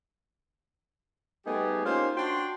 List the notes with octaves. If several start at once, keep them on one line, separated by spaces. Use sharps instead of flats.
G3 A3 B3 D#4 G4 G#4
A#3 C#4 D#4 F4 G4 C5
D4 F#4 G5 C6